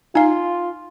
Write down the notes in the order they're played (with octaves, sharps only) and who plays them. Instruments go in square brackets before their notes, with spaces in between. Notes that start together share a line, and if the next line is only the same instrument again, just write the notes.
[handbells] D#4 F5 [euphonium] F4 [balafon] G#5